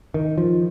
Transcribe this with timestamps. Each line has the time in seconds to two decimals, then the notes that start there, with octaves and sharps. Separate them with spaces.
0.14 D#3
0.38 F3